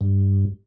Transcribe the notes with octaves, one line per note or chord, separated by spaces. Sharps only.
G2